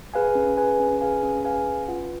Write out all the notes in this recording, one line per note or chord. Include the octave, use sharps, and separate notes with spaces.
G#4 B4 F5 G#5
C#4
G#4 B4 F5 G#5
C#4
G#4 B4 F5 G#5
C#4
G#4 B4 F5 G#5
C#4
F4 B4 F#5